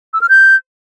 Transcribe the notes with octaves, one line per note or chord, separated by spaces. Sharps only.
E6
F6
G6